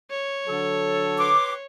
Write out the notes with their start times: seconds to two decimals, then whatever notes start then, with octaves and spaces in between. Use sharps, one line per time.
0.11 C#5
0.48 D3 F#3 A4
1.19 B4 C6 D6